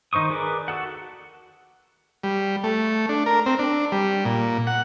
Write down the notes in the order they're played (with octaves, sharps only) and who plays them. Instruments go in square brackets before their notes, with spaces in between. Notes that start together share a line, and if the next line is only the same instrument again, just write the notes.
[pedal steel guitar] D#3 D#4 C5 C#6 D#6
G#4 A#4 B4 D5 D6
F#4 A4 F#5
[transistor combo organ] G3
A3
D4
A#4
C4
D4
G3
A#2
F#5